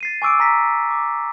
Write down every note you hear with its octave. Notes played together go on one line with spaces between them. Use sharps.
A6 C7 D#7
G#5 C#6 D6 E6 C7 D7
G#5 A#5 A#6 B6
D6